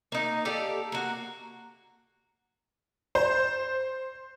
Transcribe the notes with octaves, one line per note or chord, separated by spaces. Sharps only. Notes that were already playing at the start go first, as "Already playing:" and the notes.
A#3 D#4
G4 A4 D5 F5
A#3 F#4
C5